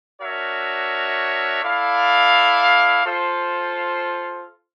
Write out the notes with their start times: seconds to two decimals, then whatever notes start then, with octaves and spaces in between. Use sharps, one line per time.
0.20 D4 F#4 A#4 C#5 E5
1.63 E4 A4 D5 F5
3.04 F4 A4 C5 F5